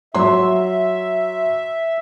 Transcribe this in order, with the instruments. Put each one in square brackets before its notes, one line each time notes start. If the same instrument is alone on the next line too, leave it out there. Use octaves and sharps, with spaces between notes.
[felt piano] F#3 C6 [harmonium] E5